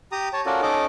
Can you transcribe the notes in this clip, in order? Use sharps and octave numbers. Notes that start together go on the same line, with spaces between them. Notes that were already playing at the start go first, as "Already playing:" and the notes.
G4 A#5 D#6
C#5 A5
C#4 F4 F#4 A4 A#4 D5
C#4 D#4 A4 D#5 D6